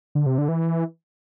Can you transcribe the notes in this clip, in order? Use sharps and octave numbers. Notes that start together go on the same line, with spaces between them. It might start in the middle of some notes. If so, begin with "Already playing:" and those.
D3
C3
D3
E3